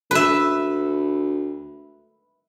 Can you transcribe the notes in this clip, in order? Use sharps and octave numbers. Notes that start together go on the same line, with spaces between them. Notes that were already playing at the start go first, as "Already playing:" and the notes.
D2 B4 E5